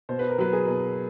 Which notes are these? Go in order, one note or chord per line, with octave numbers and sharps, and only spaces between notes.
B2 C5
B4
A#4
F#3 B4
G#4
B2